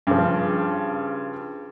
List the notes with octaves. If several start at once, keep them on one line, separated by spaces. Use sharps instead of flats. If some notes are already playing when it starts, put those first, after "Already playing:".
G2 C#3 F3